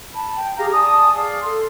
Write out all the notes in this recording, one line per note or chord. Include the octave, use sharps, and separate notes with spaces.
A5 B5
G5
G4 G#4 F5 A#5
D5 G#5 A5 D#6
G#4 D5 F5
A4 C6